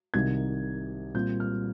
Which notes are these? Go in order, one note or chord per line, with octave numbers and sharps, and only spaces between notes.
C2 C3 D#3 G#6
A#2 G3 C4 F4 G6
F6